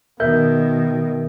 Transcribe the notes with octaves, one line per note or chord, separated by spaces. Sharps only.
B2 D#3 A#4 E5 G6